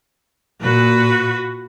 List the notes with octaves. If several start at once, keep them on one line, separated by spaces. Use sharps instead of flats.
A#2 F#4 B4